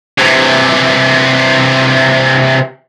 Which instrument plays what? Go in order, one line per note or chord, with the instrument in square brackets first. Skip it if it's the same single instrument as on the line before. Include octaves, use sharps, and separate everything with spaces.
[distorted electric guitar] C3 E3